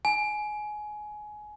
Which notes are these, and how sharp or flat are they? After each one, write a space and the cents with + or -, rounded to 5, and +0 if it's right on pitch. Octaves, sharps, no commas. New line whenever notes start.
G#5 +20